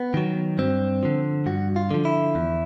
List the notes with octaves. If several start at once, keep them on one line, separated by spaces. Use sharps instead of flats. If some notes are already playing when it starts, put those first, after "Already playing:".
Already playing: B3
D#3 F#3
G2 C4
D3 F3
G2 F#4
F4
D3 F3
E4
E2